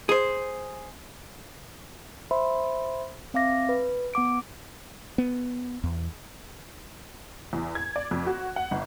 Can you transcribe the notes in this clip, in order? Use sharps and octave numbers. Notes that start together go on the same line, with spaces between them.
G#4 C5
C5 E5 B5 C6
C4 E5 F5 D6 A#6
B4
B3 F#5 D6 D7
B3
E2
E2
G#6
D5
F2
F#4
F#5
G1